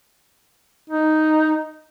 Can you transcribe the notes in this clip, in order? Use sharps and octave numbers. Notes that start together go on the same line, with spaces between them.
D#4